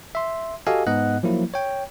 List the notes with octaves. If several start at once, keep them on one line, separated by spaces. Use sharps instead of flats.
E5 C6
F#4 G4 A4 D#5 F5 G#5
G#2 B3 D#5 F#5 F#6
F3 F#3 A#3 E4
C#5 G5